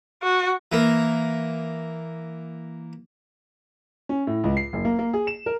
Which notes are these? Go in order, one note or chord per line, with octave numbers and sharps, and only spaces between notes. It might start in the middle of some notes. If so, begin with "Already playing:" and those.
F#4
E3 A#3
C#4
A2
C#2
C7
F#1
A#3
A#3
G#4
E7
A#4